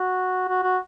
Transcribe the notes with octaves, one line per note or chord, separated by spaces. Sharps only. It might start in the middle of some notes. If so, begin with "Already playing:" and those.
Already playing: F#4
F#4
F#4